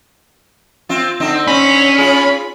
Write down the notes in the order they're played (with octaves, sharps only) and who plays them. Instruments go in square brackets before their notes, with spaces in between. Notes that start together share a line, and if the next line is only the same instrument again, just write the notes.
[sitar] C4 F4
D3 C4 D#4
[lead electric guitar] C#4 [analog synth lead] B5
[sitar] F4 G#4